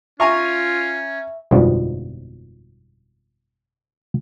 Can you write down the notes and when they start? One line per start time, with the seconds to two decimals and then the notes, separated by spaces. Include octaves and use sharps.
0.20 C#4 F4 E5 G#5 A#5 C#6
1.51 G1 F2 G#2 B2 F3 G3